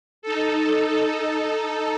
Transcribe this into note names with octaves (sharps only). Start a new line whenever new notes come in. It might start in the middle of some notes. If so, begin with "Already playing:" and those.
D#4 A4